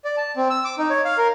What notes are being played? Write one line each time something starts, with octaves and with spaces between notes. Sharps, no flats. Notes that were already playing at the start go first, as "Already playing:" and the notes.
D5
A5
C4
E6
D6
D#4
C#5
F5
A#4